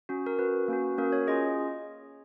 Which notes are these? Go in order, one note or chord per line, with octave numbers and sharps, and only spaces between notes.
C#4 F#4
A#4
C#4 F#4 B4
A#3 C#4 F#4
A#3 C#4 F#4 A#4
C#5
C#4 F4 G#4 D#5